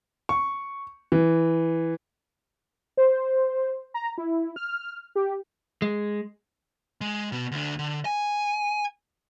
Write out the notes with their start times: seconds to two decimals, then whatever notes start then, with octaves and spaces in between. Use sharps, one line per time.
0.29 C#6
1.12 E3
2.97 C5
3.94 A#5
4.18 E4
4.56 F6
5.16 G4
5.82 G#3
7.01 G#3
7.32 B2 B3
7.52 D2 D3
7.79 D3
8.05 G#5